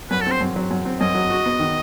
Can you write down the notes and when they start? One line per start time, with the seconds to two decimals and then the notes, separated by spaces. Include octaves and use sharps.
0.11 F#2 B4
0.21 A4
0.26 C4 C5
0.41 F#2
0.56 F#3
0.71 F#2
0.85 C4
1.00 F#2 D#5
1.15 F#3
1.30 F#4
1.46 B3
1.59 D#3